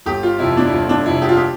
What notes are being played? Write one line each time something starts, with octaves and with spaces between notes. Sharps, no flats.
G1 G4
F4
F2 C3 E4
D4
E4
G1 F4
D4
F2 C3 E4
G4
F4
G4